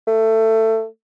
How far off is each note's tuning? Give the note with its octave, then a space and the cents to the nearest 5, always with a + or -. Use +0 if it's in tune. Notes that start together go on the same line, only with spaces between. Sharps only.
A3 +20